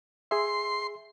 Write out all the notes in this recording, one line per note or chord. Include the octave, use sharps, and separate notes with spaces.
G#4 E5 C6